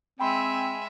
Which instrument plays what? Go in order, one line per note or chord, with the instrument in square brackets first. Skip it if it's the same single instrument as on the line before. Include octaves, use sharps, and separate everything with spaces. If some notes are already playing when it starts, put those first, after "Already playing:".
[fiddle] G#3 E5 [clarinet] C4 [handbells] G5 B5 C6